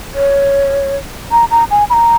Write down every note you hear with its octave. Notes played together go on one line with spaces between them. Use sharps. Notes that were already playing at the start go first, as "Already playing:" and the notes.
C#5
A#5
A#5
G#5
B5
A#5